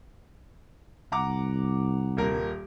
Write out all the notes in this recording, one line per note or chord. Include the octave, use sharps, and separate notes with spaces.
C2 F#5 A#5 D6
D#1 A#3 A#4